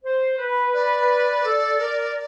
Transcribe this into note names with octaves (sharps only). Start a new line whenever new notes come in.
C5
B4
D5
A4
A#4